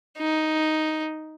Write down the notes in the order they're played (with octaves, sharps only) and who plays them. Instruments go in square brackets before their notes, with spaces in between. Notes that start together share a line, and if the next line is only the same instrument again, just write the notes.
[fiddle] D#4